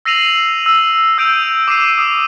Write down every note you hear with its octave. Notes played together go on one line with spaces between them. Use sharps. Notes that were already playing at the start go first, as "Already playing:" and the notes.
E6 A#6 C7 D#7 F7 F#7
E6
D#6 E6 G6 D7 D#7 F7
D6 E6 C7 D#7
D#6 E6